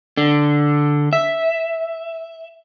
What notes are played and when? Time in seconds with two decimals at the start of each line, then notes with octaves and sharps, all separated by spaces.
0.17 D3
1.13 E5